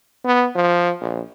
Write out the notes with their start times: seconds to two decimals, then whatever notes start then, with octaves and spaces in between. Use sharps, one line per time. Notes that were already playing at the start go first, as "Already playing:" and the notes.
0.25 B3
0.55 F3
1.01 A#1